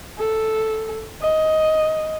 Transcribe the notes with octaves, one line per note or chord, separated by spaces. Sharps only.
A4
D#5